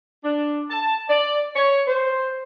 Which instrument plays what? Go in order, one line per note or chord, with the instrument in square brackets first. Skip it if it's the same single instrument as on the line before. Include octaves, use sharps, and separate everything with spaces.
[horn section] D4
A5
D5
C#5
C5